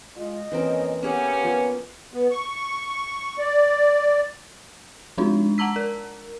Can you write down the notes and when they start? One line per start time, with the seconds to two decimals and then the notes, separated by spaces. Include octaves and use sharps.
0.16 G#3 F4 D#5
0.52 F2 E3 A#3 C4 C#4 A#4
1.03 A#3 B3 C#4 G4 G#4 F#5
1.43 F3 A#3
2.14 B3
2.31 C#6
3.39 D5
5.18 F3 G#3 D4 D#4 F4
5.58 F#5 A5 A#5 E6 B6
5.76 A#4